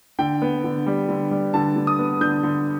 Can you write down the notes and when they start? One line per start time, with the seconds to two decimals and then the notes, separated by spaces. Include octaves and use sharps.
0.19 D3 G5
0.42 B3
0.64 D3
0.86 G3
1.09 D3
1.31 G3
1.54 D3 A5
1.76 D3
1.87 D#6
1.99 B3
2.21 D3 G6
2.43 D3